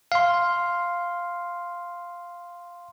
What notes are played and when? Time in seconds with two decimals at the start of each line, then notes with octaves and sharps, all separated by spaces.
0.12 F5 C6